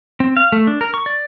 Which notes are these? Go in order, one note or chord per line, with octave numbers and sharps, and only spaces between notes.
C4
F5
A3
D4
A#4
C#6
D5